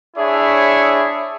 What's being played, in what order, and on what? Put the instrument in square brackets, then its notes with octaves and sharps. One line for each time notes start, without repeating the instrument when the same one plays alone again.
[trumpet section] D4 E4 G#4 C#5 E5